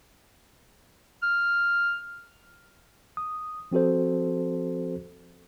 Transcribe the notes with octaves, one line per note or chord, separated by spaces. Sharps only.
F6
D#6
F3 C4 F#4 A4 C5